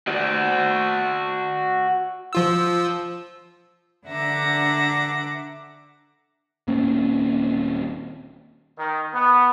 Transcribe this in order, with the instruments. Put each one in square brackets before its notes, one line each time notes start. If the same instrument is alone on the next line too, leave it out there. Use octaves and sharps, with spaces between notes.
[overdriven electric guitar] F#4 D5
[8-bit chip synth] F3 F4 E6
[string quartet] D3 D4 E5 F#5 A#5 D6
[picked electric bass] D#1 A#3 C4 C#4
[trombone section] D#3
B3